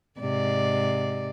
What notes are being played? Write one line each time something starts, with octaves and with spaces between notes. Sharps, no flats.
G#2 C3 D5